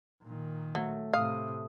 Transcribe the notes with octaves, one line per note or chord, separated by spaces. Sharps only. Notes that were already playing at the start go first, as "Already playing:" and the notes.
A#2 D#3
F#3 A3
A2 C3 F5 D#6